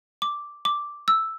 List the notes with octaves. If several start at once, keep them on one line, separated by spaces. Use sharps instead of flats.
D6
D6
E6